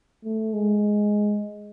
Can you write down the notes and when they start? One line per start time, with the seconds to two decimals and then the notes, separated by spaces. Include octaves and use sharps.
0.25 A3
0.54 G#3